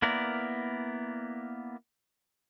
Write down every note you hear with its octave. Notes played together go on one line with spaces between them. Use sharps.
A#3 B3 E4 A#4 D5